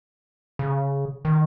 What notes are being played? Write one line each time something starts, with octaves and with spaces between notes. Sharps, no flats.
C#3
D#3